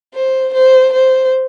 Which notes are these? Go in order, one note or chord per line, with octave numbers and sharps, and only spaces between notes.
C5
C5
C5